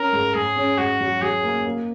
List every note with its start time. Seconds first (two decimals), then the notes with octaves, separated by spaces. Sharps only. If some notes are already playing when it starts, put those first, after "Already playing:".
Already playing: C#4 A#4
0.13 G#2
0.34 G#2 G#4
0.56 C#4
0.78 G#2 F#4
1.00 F#3
1.22 F#3 G#4
1.43 A#3
1.65 A#3